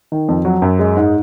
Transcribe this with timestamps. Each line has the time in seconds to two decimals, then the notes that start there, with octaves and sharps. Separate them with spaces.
0.12 D#3
0.29 F2
0.45 F#3
0.62 F#2
0.79 G#3
0.97 G#2